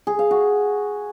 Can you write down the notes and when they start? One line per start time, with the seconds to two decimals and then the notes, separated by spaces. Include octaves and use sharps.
0.07 G#4
0.19 F5
0.31 F#4